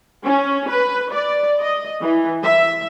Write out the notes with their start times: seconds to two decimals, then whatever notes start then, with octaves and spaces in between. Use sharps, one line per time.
0.24 C#4
0.69 B4
1.13 D5
1.60 D#5
2.01 E3
2.43 E5